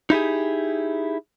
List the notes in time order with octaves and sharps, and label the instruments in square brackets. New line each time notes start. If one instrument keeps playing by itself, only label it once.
[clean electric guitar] D#4 E4 G4 G#4